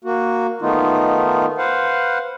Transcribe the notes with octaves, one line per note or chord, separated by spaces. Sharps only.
A#3 F#4
D#3 A3 B3 D#4 F4
B4 C5 F5 F#5